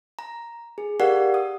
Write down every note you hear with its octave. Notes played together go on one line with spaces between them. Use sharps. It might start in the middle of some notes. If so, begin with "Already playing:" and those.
A#5
G#4
G4 A#4 D5 F5 F#5
D#6